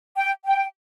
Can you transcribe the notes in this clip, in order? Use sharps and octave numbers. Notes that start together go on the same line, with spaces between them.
G5
G5